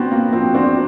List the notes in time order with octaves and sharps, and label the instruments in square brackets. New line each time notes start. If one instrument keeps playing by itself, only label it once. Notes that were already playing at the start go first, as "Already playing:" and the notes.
Already playing: [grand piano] B3 C4 [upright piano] D4 F#4
[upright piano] A#3
[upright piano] F3 [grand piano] C4
[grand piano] C4 D4 [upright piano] F#4